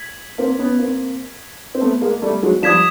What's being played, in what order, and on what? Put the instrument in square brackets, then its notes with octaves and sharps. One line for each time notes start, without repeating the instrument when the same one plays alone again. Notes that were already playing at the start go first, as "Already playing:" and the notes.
Already playing: [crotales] G#6 B6 F#7
[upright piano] A#3 C4
B3 C#4
A#3 C4
C4
A3 B3
G#3 A#3
G3 A3
F#3 G#3
[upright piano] F3 G3 [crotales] D#6 G#6 B6 E7